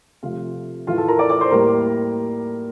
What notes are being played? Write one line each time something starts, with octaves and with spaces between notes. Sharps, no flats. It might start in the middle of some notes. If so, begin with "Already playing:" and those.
C3 F3 A3 F4 F5
A2 E3 A3 F4 F5
A4 A5
A#4 A#5
D5 D6
D5 D6
C5 C6
A2 G3 A#3 A#4 A#5